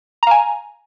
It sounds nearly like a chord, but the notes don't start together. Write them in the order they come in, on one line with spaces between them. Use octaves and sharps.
A#5 F5 G#5